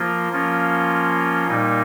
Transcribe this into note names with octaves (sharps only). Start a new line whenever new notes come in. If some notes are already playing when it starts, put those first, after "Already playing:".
Already playing: F3 A#3 F4
F3 A#3 C#4 F4
A#2 G3 A#3 D#4